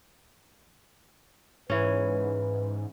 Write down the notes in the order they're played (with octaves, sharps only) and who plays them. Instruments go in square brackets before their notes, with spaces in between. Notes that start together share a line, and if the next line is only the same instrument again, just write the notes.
[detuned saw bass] G#2 [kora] E3 C#4 [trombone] B4